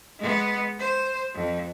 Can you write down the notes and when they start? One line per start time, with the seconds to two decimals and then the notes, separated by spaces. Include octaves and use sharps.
0.19 G#3 B3
0.79 C5
1.34 F2